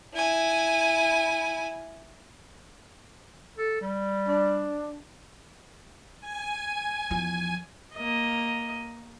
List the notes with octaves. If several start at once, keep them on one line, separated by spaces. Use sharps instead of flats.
E4 G#5
A4
G3
D4
G#5
E2 F3
A#3 D#5